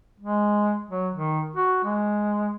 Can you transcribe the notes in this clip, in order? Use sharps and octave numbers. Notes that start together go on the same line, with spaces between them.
G#3
F#3
D#3
F#4
G#3